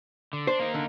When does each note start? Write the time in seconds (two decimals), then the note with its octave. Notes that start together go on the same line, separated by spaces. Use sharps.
0.33 D3
0.47 D4 C5
0.59 A#3 D#4
0.74 D3